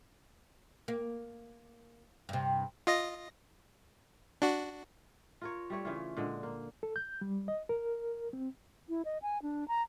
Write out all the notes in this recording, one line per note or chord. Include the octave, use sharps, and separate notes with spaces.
A#3
G2 C3
F4 D#5 A#6
D4 F#4
F4 A#4 C#5
G3 A3 C#5
C#3 E3 F4
A#2 D3 G#3
A#3
A4
G6
G3
D#5
A#4
C4
E4
D#5
G#5
D4
A#5